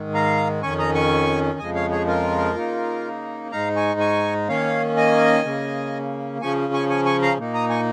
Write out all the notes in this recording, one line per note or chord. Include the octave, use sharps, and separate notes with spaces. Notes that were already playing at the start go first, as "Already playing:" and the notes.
Already playing: G#2 D#3 G#3
F5 A#5
F2 D#3 C#4 G#5 C#6
A#5 D#6
G#5 C#6
F2 C#3 F3 G#3 D#5 G#5
C#5 F5
G#4 C#5
F4 A#4
C#3 A#3 D#4
G#2 G#3 D#4 F5 A#5
G#5 C#6
G#5 C#6
D#3 A#3 C#4 C#5 F5
D#5 G#5
C#3 A#3 C#4
C#3 F3 C#4 G#5 C#6
G#5 C#6
G#5 C#6
G#5 C#6
F5 A#5
A#2 A#3 D#4
A#5 D#6
G#5 C#6